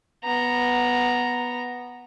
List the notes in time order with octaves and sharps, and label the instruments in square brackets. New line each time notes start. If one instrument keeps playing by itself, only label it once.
[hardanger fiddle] B3 A#5